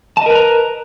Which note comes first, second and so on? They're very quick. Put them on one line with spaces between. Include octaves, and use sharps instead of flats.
A5 D#5 A#4 B4 A#5